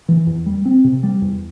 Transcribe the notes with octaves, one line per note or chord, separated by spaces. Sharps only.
E3
E2
G3
C4
C3
G3
E2